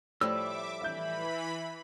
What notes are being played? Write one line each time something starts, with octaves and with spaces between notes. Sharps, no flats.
A2 F3 G3 E5 D6 E6
E3 E5 B5 G6